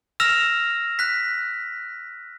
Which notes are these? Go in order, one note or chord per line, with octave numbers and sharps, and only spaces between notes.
E6 F6 A#6 E7 F7
F#6 B6